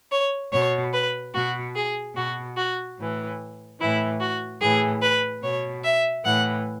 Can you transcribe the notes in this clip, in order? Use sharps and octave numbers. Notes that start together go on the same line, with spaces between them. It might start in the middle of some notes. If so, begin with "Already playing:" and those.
C#5
B2 C#5
B4
B2 F#4
G#4
B2 F#4
F#4
A2 E3
A2 E3 E4
F#4
A2 E3 G#4
B4
B2 C#5
E5
A2 E3 F#5